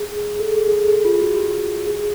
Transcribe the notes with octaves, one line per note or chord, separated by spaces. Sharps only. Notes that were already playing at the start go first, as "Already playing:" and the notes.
Already playing: G#4
G#4
A4
G#4
G#4
A4
G#4
F4
F#4
G4
G#4